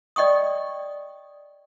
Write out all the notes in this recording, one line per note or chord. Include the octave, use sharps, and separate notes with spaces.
D5 D#5 G5 C#6 D#6